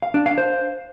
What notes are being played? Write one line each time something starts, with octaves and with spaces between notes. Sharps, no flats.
F5
D4
F5
C5